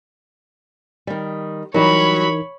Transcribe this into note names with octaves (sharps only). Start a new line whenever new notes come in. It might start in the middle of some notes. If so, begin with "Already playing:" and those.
D#3 G3
E3 F#3 G3 D#4 A#4 C#5 B5